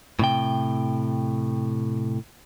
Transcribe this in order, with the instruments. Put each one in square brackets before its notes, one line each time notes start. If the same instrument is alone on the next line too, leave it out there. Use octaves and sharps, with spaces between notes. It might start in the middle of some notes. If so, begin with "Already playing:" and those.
[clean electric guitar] A2 C3 G5